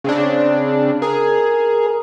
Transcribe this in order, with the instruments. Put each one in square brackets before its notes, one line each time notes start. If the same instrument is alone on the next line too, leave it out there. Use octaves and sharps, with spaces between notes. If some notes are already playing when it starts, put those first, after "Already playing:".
[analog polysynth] C#3 C4 D4
[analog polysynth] G#4 [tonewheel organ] A#4